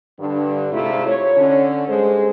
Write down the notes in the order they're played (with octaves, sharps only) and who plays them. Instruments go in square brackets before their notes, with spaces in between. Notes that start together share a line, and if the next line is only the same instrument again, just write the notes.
[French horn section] G2 D3
G#2 C3 A3 E4 F4
C#5
D3 C#4
G2 G#3 G#4 A4 C5